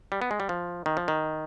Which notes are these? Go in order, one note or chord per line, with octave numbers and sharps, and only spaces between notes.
G3
B3
G#3
G3
F3
D#3
F3
D#3